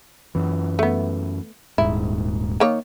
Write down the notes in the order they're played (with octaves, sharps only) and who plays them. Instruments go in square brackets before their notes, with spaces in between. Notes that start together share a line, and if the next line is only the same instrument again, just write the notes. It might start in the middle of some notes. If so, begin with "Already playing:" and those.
[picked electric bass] F#2 E3
[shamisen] A3 B3
[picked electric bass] D#1 G#2 [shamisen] E4
[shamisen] D#3 A#3 C#5